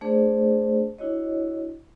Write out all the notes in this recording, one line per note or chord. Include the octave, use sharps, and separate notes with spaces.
A3 D4 G#4 C5 D5
D4 E4 F#4 C#5 D#5